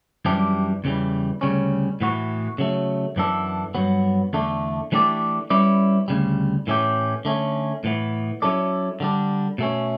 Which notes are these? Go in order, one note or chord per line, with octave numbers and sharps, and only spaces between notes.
F#2 E3 G3 D4 G4
E2 C#3 E3 G3
D2 C#3 G3 C#4
A2 E3 B3 F#4
C#3 F#3 A3
F#2 E3 B3 D4 A4
G2 F#3 B3
E2 D3 A3 D4
E3 A3 D4 G4 D5
G3 C#4 E4 B4 D5
D2 C#3 G3
A2 E3 A3 C#4 G4
D3 A3 C#4
A2 E3 B3
F#3 C#4 E4 A4 D5
D3 G3 D4
B2 A3 C#4